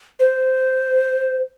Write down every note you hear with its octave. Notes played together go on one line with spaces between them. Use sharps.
C5